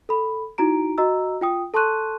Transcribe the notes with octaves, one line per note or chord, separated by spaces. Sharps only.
A4 B5
D#4 E4 F#4 A#5 D7
F#4 D#5 A#5 E6
F4 G5 D#6
A4 A5 C6 C#6 F#6 D#7